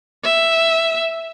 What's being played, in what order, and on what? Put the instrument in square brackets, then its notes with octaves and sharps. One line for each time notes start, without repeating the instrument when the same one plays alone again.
[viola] E5